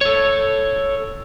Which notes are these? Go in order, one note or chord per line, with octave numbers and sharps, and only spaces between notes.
A4 C#5